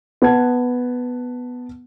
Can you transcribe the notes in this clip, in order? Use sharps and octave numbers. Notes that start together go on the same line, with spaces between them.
B3 F#5 A5 G#6